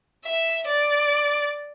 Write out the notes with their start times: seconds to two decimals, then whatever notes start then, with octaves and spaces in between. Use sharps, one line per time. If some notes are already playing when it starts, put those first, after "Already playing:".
0.25 E5
0.66 D5